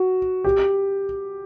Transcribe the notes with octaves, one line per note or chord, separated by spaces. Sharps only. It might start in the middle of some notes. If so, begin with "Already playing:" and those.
Already playing: F#4
G4